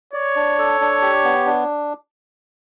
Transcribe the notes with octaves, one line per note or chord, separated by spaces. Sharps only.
C#5 D5
D4
A4
D4
G4
B3
D4